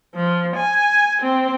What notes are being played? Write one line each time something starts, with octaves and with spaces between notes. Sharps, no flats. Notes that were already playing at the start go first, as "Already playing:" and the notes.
F3
G#5
C4